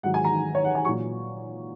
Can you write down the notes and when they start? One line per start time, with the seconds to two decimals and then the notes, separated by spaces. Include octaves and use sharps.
0.03 G#2 D#3 F#3 F#5
0.14 G#5
0.24 A#5
0.55 C#5
0.65 F#5
0.75 G#5
0.85 A#2 F#3 C#6